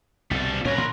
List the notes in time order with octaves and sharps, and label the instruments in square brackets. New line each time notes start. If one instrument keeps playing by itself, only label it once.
[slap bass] C2 B2 [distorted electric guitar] G3 A4
[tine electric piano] C4
[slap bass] D2 A#2 A#3 [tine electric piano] C#4 C#5 [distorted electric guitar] A#4 B4
[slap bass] A#2 D#3 [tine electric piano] C6 F#6 A#6